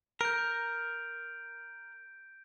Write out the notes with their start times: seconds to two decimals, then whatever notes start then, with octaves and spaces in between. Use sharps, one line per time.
0.21 A#4 G6 D7